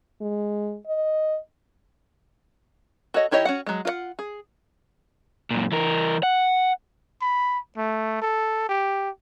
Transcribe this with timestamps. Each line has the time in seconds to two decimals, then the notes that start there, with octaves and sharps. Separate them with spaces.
0.21 G#3
0.87 D#5
3.14 F#4 A4 C#5 D#5
3.31 D#3 E4 G4 C#5 D#5
3.45 C#4 F#4 F#5
3.67 F#3 G#3
3.85 F4 B4 F#5
4.19 G#4
5.51 F#2 A#2
5.72 E3 A#4
6.23 F#5
7.22 B5
7.77 A3
8.22 A4
8.69 G4